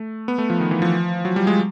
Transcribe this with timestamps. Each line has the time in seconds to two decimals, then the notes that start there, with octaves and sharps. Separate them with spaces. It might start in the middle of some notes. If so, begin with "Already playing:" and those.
Already playing: A3
0.28 B3
0.38 A3
0.50 F3
0.60 D#3
0.71 E3
0.82 F3
1.25 F#3
1.36 G3
1.47 G#3